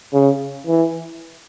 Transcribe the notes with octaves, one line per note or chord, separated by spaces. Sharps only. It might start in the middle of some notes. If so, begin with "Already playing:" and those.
C#3
E3